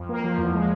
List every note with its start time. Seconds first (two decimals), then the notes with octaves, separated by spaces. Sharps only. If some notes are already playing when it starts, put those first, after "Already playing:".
Already playing: F2
0.09 A#3
0.24 F3
0.38 E2
0.53 G#3